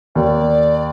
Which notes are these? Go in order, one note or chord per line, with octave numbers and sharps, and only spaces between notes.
D#2 D5